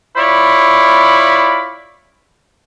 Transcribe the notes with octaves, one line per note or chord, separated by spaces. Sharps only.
E4 F4 C#5 D5 B5